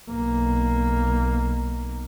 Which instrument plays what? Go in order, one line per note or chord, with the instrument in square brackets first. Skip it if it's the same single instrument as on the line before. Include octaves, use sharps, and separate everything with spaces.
[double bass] B1 A#3